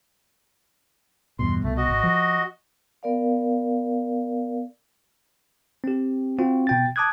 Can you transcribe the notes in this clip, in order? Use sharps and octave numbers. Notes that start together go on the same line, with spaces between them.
E2 G2 B2 C6
C2 B2 A3
F#4 D#5
G#1
F3
B3 A#4 D5 F5
C4 G4
C4 F4 F#4
B2 G5 A6
A5 D6 D#6 F#6 G#6